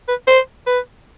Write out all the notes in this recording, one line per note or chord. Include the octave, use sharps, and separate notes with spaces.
B4
C5
B4